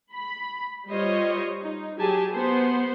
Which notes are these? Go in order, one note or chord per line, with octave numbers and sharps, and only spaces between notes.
B5
G3 F4 C5 C#5 D#5
D#4
F#3 G4 G#4 G#5 A5
B3 C5